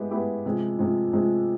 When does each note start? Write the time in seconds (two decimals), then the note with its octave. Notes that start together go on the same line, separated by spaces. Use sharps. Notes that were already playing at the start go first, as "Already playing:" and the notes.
Already playing: G#3 B3 E4 G4
0.10 G#3 B3 E4 G4
0.45 C3 F3 G#3
0.78 C3 F3 G#3
1.13 C3 F3 G#3